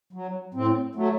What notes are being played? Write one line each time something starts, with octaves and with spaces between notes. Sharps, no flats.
F#3
A2 C4
F#3 A3